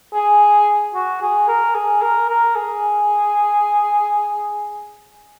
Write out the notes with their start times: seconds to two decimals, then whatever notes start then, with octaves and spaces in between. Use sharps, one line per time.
0.14 G#4
0.94 F#4
1.21 G#4
1.48 A#4
1.75 G#4
2.02 A#4
2.29 A#4
2.56 G#4